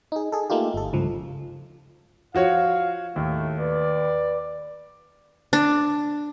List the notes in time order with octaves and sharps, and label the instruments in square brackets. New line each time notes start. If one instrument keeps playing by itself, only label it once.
[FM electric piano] D#4 G#4
G#4 A4
A3 A#3 D#4 F4 G4
G1 A4
C#2 G2 F3
[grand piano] F3 F#4 C#5 [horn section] F5
[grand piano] D#2 [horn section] A2 A3
[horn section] B4 D5
[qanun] D4